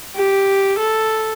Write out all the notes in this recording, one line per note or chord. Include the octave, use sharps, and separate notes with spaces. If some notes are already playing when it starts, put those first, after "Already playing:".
G4
A4